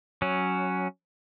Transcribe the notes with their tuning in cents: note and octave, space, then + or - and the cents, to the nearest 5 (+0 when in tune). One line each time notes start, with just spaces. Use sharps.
F#3 +0 C#4 +0